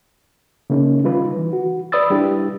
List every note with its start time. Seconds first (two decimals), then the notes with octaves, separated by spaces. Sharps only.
0.70 C#3 A#3 C#4 D#4
1.04 D#3 G3 D#4 F4 B4
1.37 E3
1.53 F#4
1.92 B4 D5 B5 D#6 E6 A6
2.10 G3 D4 E4 G4